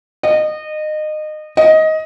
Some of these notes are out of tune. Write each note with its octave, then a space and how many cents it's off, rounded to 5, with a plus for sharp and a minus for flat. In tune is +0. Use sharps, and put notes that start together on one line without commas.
D#5 -25
D#5 +15